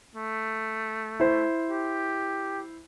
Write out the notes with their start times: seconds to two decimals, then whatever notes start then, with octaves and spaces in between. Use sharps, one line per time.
0.15 A3
1.20 E4 C5
1.70 G4